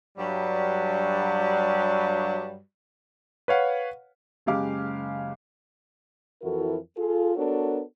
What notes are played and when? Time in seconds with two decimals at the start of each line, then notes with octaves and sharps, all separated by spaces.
0.17 G2 F#3 G3
3.48 B4 C#5 F5 F#5
4.46 F#1 C#3 G#3 G4 F5 D6
6.42 F2 E3 E4 F#4 A4 A#4
6.97 F4 G#4 A4
7.36 B3 D4 F#4 A4 A#4 C#5